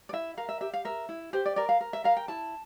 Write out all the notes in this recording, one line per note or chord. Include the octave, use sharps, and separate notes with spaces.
D5
E4 E5
A#4 F5
E5
G4 E5
F5
A#4 E5
E4
G4 C5
D5
A#4 D5
F5
A#4
E5
A#4 F5
G5
E4 A5